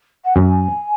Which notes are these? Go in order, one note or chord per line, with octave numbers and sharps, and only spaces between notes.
F#5
F#2 G#5